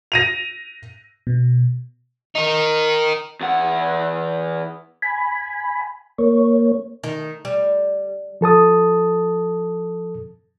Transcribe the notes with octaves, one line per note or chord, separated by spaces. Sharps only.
A#6 D#7 F7
B2
D#4 A#4
E2 F#5
G#5 B5
A#3 C#5
D#3
G3
F3 A4 A5 D#6